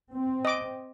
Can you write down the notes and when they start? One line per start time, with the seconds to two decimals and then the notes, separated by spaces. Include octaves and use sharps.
0.13 C4
0.45 D#5 D6